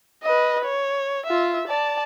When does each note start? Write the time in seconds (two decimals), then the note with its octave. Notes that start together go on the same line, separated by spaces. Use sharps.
0.23 B4 D#5
0.65 C#5
1.26 F4 E5
1.68 D5 A5